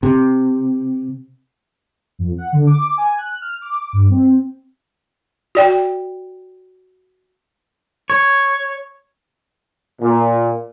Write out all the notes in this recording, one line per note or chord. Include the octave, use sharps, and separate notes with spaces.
C3
F2
F#5
D3
D6
G#5
F#6
F6
D6
G2
C4
F#4 D5 G5
C#5
A#2